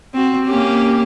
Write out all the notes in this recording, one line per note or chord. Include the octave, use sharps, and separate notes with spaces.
C4 F#4
A#3 C#4 G4